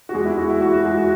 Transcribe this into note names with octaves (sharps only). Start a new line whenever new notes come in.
F#4
E2 G#3 G#4
E4
G#3 F#4
E4
E2 F#4
F#4
G#3 G#4
F#4